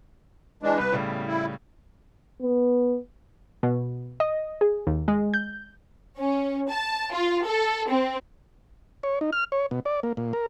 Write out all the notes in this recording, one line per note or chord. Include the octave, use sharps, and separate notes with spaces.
E3 G#3 D4
C2 B4
A2 C#3 G3
B2
E4
B3
B2
D#5
G#4
D#2
G#3
G6
C#4
A5
F4
A4
C4
C#5
D#4
F6
C#5
B2
D5
A#3
A#2
A#4